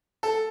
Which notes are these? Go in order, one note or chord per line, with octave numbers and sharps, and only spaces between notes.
A4